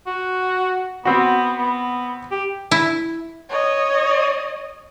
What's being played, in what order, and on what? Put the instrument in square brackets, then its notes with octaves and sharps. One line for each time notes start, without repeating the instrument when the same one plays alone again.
[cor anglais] F#4
[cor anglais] B3 [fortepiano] C4 F#4
[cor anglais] B3
G4
[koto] E4
[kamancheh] C#5 D#5